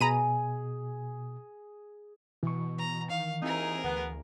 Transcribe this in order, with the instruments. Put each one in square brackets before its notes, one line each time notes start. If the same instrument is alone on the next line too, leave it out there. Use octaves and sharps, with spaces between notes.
[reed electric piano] B2 [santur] G#4 [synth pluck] A#5 B5 D#7
[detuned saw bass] B2 [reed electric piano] E3 C#6
[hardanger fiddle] A#5
[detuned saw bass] D#3 [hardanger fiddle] F5
[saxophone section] D#2 D#4 E4 [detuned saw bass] C4 [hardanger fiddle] G#4 A#4
[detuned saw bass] D2 [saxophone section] B3